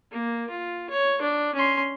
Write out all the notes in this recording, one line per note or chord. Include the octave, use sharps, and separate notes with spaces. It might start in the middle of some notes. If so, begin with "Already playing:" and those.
A#3
F4
C#5
D4
C#4 C6